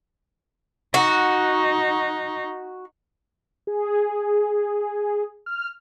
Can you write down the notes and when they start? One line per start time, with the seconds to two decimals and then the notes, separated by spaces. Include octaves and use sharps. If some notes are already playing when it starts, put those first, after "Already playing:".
0.94 D#4 F#4
3.67 G#4
5.46 F6